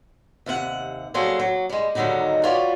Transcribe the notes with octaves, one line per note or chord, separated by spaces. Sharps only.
D#2 C3 A#4 F#5
F#3 G3 A#3 G#4 A4 C5
F#3
G3 G#3
D#2 G#2 D3 F#3 G3 D#4
F4 F#4 B4 C#5 D5